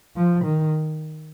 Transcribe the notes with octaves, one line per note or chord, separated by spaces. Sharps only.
F3
D#3